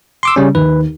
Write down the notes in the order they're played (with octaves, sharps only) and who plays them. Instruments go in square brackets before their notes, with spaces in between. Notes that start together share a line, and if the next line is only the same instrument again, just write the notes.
[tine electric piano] C6 D6 E6
C#3 G3 C#4
[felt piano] D#2 [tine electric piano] B4